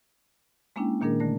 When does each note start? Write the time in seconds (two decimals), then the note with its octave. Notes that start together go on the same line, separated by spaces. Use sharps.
0.76 G#3 A#3 C#4 D4 E4 G5
1.01 A#2 D#3 A#3 D4 G#4 A#4
1.20 D3 A3 A#6